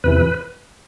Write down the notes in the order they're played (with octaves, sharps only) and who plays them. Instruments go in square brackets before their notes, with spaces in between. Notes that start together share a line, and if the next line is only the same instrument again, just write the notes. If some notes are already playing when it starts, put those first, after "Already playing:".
[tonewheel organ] E2 C3 E3 B4